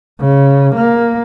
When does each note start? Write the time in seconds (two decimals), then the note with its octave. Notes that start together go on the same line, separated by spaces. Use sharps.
0.20 C#3
0.76 A#3